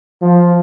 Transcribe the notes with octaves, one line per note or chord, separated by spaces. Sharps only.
F3